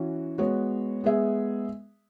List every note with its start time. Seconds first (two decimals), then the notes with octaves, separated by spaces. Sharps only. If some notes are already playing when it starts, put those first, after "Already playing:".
Already playing: E3 C#4 F#4
0.38 G#3 B3 F#4 C#5
1.04 G#3 B3 G#4 E5